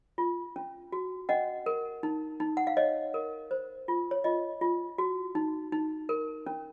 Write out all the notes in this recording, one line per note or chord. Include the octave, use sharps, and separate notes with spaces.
F4
C#4
F#4
C#4 D#5 F#5
A#4
D#4
D#4
F#5
F5
C#5 D#5
A#4
C5
F4
C#5
F4 D#5
F4
F#4
D#4
D#4
A#4
C#4